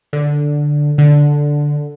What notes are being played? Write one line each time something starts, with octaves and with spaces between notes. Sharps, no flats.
D3
D3